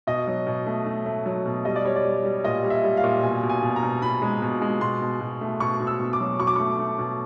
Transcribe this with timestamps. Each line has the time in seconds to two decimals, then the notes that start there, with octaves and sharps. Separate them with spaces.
0.07 B2 D#5
0.27 F#3
0.47 B2
0.66 A3
0.86 A3
1.06 A3
1.26 F#3
1.46 B2
1.65 G3 D#5
1.76 D5
1.85 G3 C#5
1.96 D5
2.05 G3
2.24 G3
2.44 A#2 D#5
2.64 G3
2.70 E5
2.84 G3
2.97 F5
3.04 A#2
3.23 B2 G#5
3.43 B2
3.49 G#5
3.62 B2
3.76 A#5
3.83 B2
4.02 B2 B5
4.22 G#3
4.42 B2
4.62 G#3
4.81 B2 C6
5.02 B2
5.21 B2
5.41 A3
5.60 B2 C#6
5.80 B2
5.87 E6
6.00 B2
6.13 D6
6.20 F#3
6.39 B2 C#6
6.47 D6
6.56 A3 C#6
6.79 A3
6.99 B2